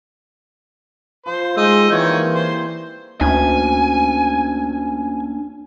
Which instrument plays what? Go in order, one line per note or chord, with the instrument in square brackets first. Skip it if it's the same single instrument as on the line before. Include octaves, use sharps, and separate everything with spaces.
[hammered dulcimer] F3 [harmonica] C5
[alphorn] G#3 [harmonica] D#4 D#5 E6 [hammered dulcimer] G4 C5
[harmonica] D#3 C#5 [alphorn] E3 [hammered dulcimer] G3 A#3 C4
[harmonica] C5
[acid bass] D2 [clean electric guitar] A#3 C#4 D4 [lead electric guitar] G#5